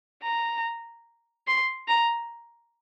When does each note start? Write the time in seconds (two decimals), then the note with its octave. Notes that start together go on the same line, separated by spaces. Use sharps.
0.23 A#5
1.47 C6
1.88 A#5